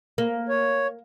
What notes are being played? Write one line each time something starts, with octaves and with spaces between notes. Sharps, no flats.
A#3
C#5